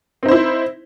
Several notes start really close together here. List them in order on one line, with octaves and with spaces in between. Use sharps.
C4 D#4 C5 E4